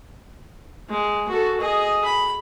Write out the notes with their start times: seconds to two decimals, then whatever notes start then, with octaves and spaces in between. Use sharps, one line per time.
0.89 G#3
1.28 F#4 A4
1.60 G#4 D#5
2.04 B5